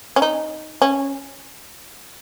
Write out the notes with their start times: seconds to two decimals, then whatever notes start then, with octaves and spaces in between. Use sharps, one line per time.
0.16 C#4
0.22 D#4
0.82 C#4